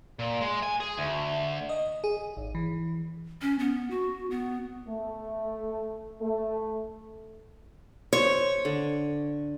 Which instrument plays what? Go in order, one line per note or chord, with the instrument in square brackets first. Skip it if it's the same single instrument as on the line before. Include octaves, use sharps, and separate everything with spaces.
[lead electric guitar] A#2
G#3
G#5
G#4
D2
[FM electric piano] D#5
G#4
G#1
E3
[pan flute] C#4
B3
F#4
B3
[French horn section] A3
A3
[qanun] C5 [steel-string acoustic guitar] C#5
[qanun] D3